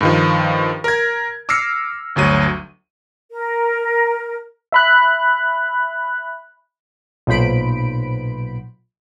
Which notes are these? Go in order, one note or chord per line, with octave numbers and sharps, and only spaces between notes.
G2 D#3 F3
A#4 G#6
D6 E6 F6 A#6 C7 C#7
G1 D2 F#3 D#7
A#4
E5 B5 F#6
B1 A#2 B3 C5 B5 D7